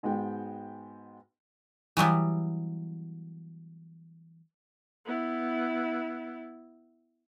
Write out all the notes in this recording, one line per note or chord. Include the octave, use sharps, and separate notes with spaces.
G#2 G#3 B3 F#4 G5
E3 F#3 G3 B3
B3 E4